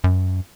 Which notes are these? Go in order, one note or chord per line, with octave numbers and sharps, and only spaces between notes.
F#2